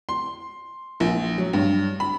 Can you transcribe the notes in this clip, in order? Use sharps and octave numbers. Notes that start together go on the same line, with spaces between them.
C6
A#1
F#3
G2
B5